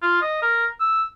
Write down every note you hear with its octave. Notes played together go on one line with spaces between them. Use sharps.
F4
D#5
A#4
E6